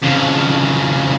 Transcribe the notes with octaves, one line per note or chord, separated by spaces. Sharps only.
F2 C#3